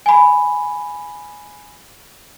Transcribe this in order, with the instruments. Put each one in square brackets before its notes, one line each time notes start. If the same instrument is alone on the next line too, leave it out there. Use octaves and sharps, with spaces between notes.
[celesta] G#5 B5